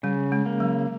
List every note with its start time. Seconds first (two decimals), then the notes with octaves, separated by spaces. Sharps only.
0.03 C#3 G3
0.32 G#3
0.46 A#3
0.60 F#3